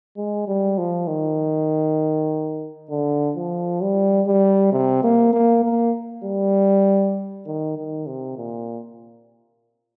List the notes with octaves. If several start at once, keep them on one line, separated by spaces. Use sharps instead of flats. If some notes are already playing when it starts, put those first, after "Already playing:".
G#3
G3
F3
D#3
D3
F3
G3
G3
C3
A#3
A#3
A#3
G3
D#3
D#3
C3
A#2